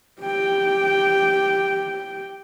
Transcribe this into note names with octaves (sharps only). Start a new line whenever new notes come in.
G4 G5